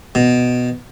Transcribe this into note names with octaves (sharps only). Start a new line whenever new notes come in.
B2